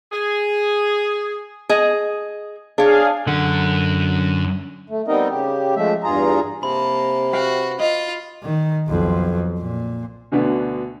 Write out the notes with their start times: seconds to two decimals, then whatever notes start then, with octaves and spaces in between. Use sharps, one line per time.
0.12 G#4
1.69 G#4 D#5
2.78 D4 G#4 C#5 F5
3.27 F#2 D3 F#5
4.90 A3
5.08 G3 B3 C4 D#4 A#4 D#5
5.29 C#3 G4
5.76 F3 G#3 A3 E5
6.04 E2 G2 F4 G#4 A#5
6.63 C3 A#3 A5 B5
7.33 F#4 B4 F5 G5
7.79 F4 D#5
8.43 D#3
8.87 B1 F2
9.58 A#2
10.32 D2 B2 D3 B3 B4